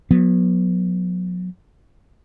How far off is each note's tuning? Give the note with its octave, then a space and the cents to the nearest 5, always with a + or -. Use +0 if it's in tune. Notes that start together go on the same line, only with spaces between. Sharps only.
F#3 -35 B3 -20